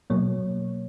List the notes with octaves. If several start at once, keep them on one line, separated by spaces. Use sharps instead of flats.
B2 F#3 A#3 C#5